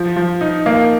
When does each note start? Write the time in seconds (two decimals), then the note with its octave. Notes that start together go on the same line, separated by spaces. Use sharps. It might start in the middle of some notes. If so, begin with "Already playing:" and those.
Already playing: F3
0.16 F3
0.41 D#4
0.66 A#3